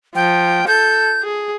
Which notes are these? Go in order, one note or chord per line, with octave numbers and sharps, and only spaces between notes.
F3 G5
A4 G6
G#4